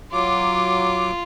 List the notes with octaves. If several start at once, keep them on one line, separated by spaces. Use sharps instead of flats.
F#3 F4 D6